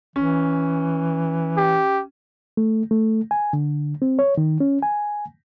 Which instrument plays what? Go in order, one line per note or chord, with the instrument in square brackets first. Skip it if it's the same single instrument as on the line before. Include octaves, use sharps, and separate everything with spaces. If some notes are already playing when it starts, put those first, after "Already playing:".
[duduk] E3 [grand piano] C#4
[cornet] G4
[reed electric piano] A3
A3
G#5
D3
C4
C#5
D#3
C#4
G#5